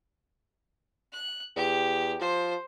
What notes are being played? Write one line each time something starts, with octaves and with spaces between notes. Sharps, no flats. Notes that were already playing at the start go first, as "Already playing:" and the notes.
F#6
E2 G4
F3 C5